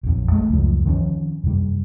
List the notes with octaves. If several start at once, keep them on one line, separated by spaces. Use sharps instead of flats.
A#1 F2
G#3 A3
C#2 F#2 F3
D#3 F3 G#3 C#4
F#2 C3 G3